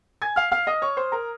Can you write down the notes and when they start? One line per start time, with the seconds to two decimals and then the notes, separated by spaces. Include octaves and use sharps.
0.22 G#5 G#6
0.36 F5 F6
0.52 F5 F6
0.67 D#5 D#6
0.82 C#5 C#6
0.97 C5 C6
1.12 A#4 A#5